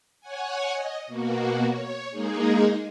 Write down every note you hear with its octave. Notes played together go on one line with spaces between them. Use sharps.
C#5 F#5 G#5
D#5
B2 A#3 F#4
C#5
G#3 A#3 D#4 G#4